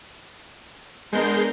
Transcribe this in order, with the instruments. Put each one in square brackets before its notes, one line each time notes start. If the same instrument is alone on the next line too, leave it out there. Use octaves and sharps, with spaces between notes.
[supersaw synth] G#3 G6 C7 [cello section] B3 D4 A#4